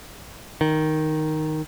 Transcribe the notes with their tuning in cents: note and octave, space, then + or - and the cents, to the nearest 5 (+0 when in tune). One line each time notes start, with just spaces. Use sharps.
D#3 +0